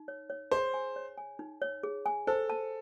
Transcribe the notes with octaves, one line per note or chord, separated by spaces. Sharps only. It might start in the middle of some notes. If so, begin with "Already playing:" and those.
Already playing: D#4
C#5
C#5
G#4 C5
G#5
C#5
G#5
D#4
C#5
G#4
G#5
A4 C5
A5